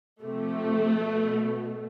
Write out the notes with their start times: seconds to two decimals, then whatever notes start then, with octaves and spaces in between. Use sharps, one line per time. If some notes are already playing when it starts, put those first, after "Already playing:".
0.22 C3 A3
0.27 F3
1.00 B2